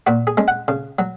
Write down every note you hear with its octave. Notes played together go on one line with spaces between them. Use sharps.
A#2 F#4
G#4
G#3 C#4
F#5
C#3
F#3